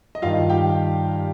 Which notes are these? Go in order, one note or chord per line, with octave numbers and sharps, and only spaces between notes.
D#5
G2 D#3 F4 F5
G4 G5